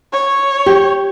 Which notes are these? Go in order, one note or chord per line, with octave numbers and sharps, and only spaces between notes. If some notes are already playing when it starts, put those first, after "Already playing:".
C#5
G4